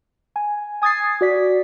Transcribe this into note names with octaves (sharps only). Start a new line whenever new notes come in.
G#5
G#5 D#6 G#6 A6 C7
F#4 D5 B6